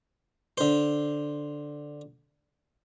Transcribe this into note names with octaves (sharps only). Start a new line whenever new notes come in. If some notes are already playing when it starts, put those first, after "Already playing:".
D3 C5